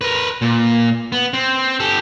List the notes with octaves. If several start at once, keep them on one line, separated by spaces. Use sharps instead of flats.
A#4 B4
A#2
B3
C4
G4 A4